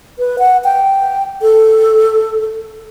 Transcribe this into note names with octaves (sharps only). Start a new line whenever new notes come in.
B4
F#5
G5
A4